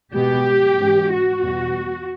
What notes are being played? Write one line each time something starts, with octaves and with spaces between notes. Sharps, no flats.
B2 G#3 B3 G4
G#2 E3 G#3 C#4
F#4
E2 B2 G3